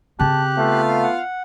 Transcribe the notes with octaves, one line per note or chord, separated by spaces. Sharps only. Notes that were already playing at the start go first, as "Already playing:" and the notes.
C#3 C4 G4 A5 F#6
A3 B3 F4 F5
F#5